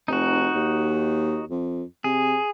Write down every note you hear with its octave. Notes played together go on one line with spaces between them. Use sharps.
F1 D#4 F#4
D#2
F2
C3 G#4